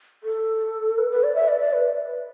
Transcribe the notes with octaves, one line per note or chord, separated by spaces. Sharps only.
A4
B4
B4
D5
E5
D5
D5
B4